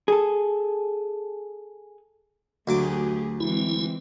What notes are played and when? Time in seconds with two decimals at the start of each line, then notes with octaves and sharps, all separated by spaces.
0.08 G#4 A4
2.67 D2 F#3 A3 G4 G#4 D6
3.40 E3 G#3 C4 E4